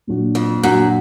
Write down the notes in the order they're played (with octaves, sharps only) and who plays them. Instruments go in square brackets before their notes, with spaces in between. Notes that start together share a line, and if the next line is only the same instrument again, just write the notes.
[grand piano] A#2 F#3 D4 F#4
[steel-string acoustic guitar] F2
[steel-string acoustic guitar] F#2 [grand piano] A#2 F#3 D4 F#4